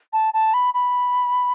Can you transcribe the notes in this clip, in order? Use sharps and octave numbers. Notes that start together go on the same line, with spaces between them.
A5
A5
B5
B5